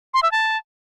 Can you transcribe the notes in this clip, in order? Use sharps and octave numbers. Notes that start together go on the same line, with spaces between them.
C6
E5
A5